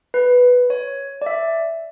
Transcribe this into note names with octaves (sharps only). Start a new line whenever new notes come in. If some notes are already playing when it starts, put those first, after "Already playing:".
B4
C#5
D5
E5